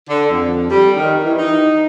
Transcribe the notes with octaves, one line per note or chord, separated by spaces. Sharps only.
D3
F2
G3
D#3
E3
D#4